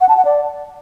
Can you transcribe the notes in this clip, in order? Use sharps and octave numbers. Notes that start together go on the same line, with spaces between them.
F#5
A5
F#5
D5